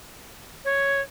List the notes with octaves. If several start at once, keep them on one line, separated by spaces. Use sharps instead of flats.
C#5